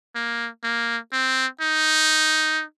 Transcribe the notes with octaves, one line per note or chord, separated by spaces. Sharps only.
A#3
A#3
C4
D#4